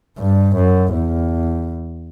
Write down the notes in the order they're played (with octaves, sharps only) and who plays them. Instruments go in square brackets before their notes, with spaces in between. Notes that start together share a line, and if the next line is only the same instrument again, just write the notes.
[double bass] G2
F#2
E2